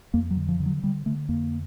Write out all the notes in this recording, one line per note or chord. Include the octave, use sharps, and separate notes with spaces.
F2 A#3
F#3
D3
F3
D3
F#3
D3 G3
D3 A3
F2 A#3